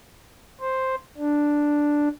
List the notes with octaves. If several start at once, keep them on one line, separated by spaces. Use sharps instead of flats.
C5
D4